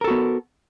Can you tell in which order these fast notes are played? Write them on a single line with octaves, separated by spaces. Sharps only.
A#4 A4 F#4 B3